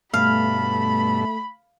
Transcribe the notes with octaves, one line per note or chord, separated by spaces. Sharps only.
G2 B2 A3 A4 F5 B5